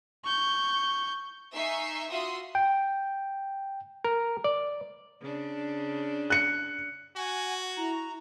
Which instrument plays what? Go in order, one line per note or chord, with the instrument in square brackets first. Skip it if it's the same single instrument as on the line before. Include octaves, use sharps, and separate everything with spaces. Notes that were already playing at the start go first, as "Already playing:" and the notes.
[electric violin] C#6 G6
[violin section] D#4 E5 G#5 C#6 C7
F4 F#4 E5 C6 D#6
[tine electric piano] G5
[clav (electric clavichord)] A#4
D5
[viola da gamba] C#3 D4
[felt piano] F#6 C#7
[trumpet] F#4 [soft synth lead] F#5 [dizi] G#5
[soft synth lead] E4 [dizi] A#5